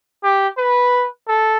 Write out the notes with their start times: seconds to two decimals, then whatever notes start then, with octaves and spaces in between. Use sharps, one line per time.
0.23 G4
0.58 B4
1.28 A4